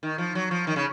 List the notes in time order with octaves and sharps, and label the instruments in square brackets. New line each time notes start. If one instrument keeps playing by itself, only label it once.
[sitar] D#3
F3
F#3
F3
D#3
C#3